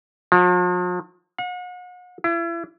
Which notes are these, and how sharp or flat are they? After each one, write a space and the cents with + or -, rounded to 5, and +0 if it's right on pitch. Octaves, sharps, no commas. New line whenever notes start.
F3 +45
F#5 -40
E4 +35